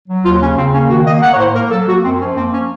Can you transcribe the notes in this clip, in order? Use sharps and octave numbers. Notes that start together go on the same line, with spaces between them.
F#3
D#2 F4
C#3 C#4
C#3 C4
A#3 C#4
D#3 F#4
A#3 D#5
A#3 F#5
C#5
A2 C5
A#3 A#4
F#3 A4
A#3 F#4
F#2 C4
F3 C#4
A#3 C4
C#4